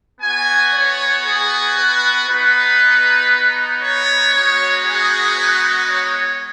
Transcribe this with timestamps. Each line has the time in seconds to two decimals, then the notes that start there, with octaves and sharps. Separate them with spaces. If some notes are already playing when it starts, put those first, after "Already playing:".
0.21 B3 F#4 G#5
0.73 C#5
1.25 G#4
1.75 B4
2.27 B3 D#4 F#4 B4
3.82 C#5
4.34 G#3 B3 D#4 F#4 C#5
4.86 G#4
5.36 B4
5.88 C#5